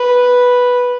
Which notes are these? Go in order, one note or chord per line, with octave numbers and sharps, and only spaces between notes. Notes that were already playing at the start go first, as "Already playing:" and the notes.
Already playing: B4